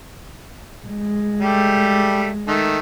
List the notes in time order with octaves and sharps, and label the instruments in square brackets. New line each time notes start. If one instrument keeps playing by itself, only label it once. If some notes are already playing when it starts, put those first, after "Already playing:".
[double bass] G#3
[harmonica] G3 A3 G4
D#3 A3